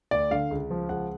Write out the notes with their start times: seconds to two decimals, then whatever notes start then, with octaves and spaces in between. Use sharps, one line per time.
0.11 D2 D5
0.31 D3 F5
0.51 C#2
0.71 F3
0.89 C#2 F#5